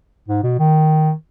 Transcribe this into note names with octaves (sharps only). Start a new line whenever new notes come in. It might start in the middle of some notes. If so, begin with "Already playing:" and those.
G#2
B2
D#3